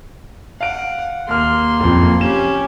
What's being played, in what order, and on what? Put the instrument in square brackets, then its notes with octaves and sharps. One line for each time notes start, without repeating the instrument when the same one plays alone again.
[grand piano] F5 D7 [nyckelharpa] F#5
[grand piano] D#2 F6 [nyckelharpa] A#3 C6
[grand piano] F#1 F2
[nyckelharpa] C#4 G4 [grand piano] E7